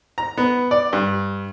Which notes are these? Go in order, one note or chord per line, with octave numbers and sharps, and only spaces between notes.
A#5
B3
D5
G2